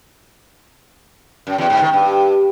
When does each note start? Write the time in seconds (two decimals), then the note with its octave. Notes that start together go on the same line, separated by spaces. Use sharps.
1.47 F#2
1.58 E2
1.70 G#2
1.82 D#3
1.93 G2